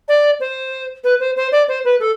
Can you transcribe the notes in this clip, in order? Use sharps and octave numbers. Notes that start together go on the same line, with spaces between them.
D5
C5
B4
C5
C5
D5
C5
B4
A4